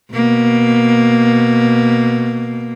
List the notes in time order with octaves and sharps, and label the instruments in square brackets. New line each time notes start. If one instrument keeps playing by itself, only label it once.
[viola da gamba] B2 A#3